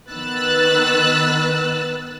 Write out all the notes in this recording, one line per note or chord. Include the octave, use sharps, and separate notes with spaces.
D#3 B3 B4 E6 F#6 A6